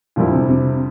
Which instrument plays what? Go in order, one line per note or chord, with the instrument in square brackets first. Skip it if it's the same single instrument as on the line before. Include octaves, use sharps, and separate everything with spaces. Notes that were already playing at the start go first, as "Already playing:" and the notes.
[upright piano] F2 D3 G3 A#3 E4 [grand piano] A#2
[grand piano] C3
C3